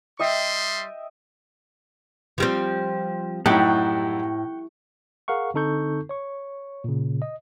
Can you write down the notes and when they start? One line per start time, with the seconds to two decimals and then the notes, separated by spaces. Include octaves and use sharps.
0.20 G3 D#5 E5 G5 C6
2.38 F3 G3 C4
3.46 F#2 A2 D#4 E4 G4 F#5 G5 C#6
5.28 G#4 A#4 F5 F#5 C#6
5.54 D3 C4 D#4 A4 C#6 G6
6.09 C#5 C#6
6.84 A#2 C#3
7.22 D#5